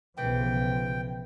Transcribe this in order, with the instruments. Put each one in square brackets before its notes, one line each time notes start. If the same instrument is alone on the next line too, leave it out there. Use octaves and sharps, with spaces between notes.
[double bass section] B1 C#3 F3 [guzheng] E3 [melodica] G5